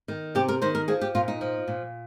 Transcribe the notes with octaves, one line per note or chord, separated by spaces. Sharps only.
D#3
C3 G4
A#4
D#3 C5
A#4
F3 G#4
G4
A#2 F4
D#4
F3
A#2